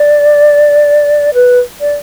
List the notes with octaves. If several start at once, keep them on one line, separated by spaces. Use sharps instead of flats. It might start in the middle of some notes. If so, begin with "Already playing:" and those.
Already playing: D5
B4
D5